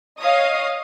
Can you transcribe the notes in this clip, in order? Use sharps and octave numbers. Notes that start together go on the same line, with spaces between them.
C#5 D#5 F5 D#6